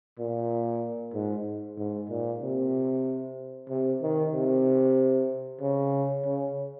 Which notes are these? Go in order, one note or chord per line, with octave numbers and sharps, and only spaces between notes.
A#2
G#2
G#2
A#2
C3
C3
D#3
C3
C#3
C#3